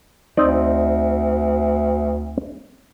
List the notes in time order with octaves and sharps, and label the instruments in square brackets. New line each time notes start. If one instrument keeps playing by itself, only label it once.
[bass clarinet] D2 [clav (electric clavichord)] C4 D#4 D5